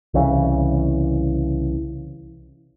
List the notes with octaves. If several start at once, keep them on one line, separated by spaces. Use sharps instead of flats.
C2 C#3 E3